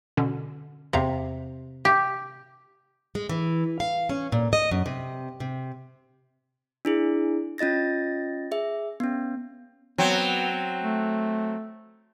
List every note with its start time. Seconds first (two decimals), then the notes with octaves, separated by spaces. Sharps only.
0.17 B2 D3 C#4
0.93 E2 C3 F5 A#5
1.85 G4
3.15 G#3
3.29 E3
3.80 F5
4.09 C#4
4.32 A#2
4.53 D#5
4.71 F#2
4.86 C3
5.40 C3
6.85 D4 E4 G#4
7.58 C#4 F4 D#5 A6 A#6
8.51 G#4 E5
9.00 B3 C#4
9.98 F#3 B3 C4
10.82 A3